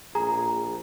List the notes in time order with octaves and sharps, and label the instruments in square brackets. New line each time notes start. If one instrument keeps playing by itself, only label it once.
[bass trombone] A#1 [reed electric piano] G#4 [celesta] A#5